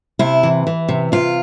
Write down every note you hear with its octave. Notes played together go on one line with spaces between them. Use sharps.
C3 E4
E3
E3
C3
C3 F4